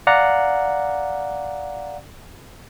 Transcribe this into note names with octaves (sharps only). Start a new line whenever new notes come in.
D5 F5 F#5 A#5